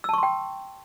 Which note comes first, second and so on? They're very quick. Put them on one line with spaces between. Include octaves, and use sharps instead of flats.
E6 A5 C#6 C6 G5